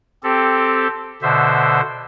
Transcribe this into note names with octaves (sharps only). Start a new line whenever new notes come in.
C4 G4 A4
B2 D3 C5 E5